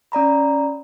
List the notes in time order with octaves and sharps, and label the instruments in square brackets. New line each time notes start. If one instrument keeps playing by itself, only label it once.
[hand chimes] C#4 D5 A#5 B5